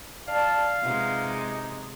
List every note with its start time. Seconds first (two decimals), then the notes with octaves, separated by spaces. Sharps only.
0.28 D5 F5 A5
0.83 C3 G#3 D#4 F4 B4 F#5